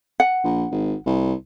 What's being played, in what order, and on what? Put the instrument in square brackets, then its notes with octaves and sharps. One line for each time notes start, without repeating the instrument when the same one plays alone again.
[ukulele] F#5
[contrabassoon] A#1
G#1
C2